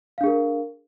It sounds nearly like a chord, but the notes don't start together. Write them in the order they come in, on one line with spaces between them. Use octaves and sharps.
F5 D4 G#4 A#4